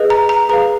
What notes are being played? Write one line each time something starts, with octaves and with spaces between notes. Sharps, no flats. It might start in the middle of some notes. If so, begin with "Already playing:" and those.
Already playing: G#4 B4 D#5
A#5
A#5
G#4 B4 F5 A#5